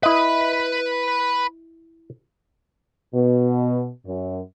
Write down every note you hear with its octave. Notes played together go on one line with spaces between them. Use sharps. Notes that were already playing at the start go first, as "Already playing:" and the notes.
E4 B4 D#5 B5
B2
F#2